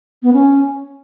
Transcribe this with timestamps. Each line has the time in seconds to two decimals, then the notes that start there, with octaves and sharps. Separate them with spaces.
0.23 B3
0.33 C#4